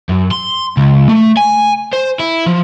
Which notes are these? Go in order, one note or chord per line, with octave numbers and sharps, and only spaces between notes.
F#2
C6
C#2
A3
G#5
C5
E4
F3